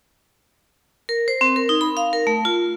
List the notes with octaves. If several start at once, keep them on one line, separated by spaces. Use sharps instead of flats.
A#4
C5
C4
A#4
D#4
B5
F5
A#4
A3
F4